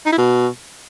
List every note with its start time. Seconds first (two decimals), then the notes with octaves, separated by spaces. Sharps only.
0.06 D#4
0.12 E4
0.18 B2